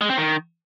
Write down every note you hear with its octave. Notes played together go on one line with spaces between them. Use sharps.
G#3
C4
D#3